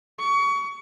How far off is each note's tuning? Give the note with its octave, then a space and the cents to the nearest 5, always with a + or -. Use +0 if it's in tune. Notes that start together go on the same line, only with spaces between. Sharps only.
C#6 +30